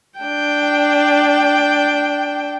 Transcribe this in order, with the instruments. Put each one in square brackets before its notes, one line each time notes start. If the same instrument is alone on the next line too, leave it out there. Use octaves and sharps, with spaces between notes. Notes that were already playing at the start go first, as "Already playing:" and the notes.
[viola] D4 G5